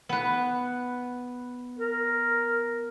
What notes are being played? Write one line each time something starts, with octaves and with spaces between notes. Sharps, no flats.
B3 B4
A#4